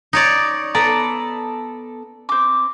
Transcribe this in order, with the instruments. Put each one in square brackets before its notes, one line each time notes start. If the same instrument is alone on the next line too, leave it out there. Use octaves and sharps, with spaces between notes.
[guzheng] D#4 C#5 D5
[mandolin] B3 A4 A#5 [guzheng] D5
[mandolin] C4 D6